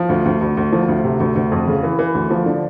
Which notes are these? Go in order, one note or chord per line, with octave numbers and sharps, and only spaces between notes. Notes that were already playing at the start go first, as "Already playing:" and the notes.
Already playing: F3
D2
D2
D2
D2
F3
D2
C3
D2
D2
F2
C#3
E3
E3
D2
F3
D3